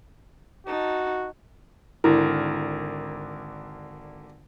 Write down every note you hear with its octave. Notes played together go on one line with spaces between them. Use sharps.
D#4 F#4 A5
G#1 D3 E4 A#4